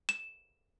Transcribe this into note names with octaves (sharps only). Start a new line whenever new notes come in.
E7